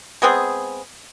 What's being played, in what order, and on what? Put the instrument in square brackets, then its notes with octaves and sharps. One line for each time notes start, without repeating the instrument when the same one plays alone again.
[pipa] G#3 B3 C4 G#4